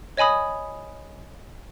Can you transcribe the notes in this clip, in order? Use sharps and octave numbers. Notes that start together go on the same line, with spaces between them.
C#5 D#5 G#5 B5 D#6